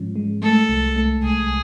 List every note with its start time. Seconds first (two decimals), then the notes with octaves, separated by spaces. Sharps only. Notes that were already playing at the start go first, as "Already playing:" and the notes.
Already playing: G#2 F3 G#3 C#4
0.16 G#3
0.42 A3 A4
0.69 C2
0.96 A3
1.23 C2 G#4